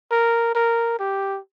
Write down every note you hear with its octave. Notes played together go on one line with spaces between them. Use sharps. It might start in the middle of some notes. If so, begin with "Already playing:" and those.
A#4
A#4
G4